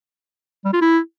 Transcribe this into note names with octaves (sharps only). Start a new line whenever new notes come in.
G3
F4
E4